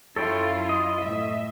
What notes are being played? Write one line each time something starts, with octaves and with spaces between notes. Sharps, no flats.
F#2 E4 F4 A4 C#5 G5
D#5
A2 E5